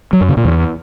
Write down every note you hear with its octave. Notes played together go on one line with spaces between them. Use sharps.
F#3
F#2
C#3
A#2
E2